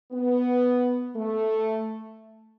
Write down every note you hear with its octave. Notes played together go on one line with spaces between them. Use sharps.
B3
A3